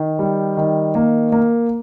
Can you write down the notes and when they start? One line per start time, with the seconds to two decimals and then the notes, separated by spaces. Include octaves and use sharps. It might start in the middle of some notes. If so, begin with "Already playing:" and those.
Already playing: D#3
0.19 G3
0.57 D#3
0.95 A#3
1.32 A#3